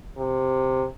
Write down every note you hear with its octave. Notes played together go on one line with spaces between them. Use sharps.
C3